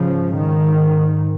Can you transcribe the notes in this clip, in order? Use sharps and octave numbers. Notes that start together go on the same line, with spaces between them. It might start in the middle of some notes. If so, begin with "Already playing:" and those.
Already playing: G#2 C#3 F3
D#3